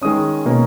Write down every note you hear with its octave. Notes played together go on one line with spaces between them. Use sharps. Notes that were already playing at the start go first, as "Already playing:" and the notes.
D#3 G#3 C#4 D#6
B2 A#3 C#4